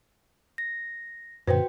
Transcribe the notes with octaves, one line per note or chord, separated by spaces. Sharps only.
A#6
F#2 A#2 D3 F#4 B4 C5 G5